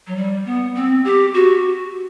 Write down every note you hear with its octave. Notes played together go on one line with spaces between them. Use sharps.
F#3
G3
B3
C4
G4
F#4